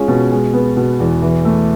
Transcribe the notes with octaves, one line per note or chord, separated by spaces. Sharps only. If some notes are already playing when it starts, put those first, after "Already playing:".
Already playing: G#3 C#4 F4
B2
G#3
B3
B2
E2
E3
A3